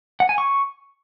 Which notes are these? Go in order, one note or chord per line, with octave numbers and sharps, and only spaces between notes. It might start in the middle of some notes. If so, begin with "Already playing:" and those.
F#5
G#5
C#6